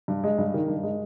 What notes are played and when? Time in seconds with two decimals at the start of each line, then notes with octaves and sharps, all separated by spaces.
0.08 G2
0.24 G#3
0.38 G2
0.54 D#3
0.68 G2
0.83 G#3